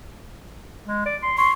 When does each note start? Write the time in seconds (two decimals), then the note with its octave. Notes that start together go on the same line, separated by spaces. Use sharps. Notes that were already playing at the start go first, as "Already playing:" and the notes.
0.86 G#3
1.05 D5
1.22 C6
1.38 C6 C#6